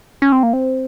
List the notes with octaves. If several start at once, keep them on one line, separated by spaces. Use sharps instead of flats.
C#4
C4
A#3
C4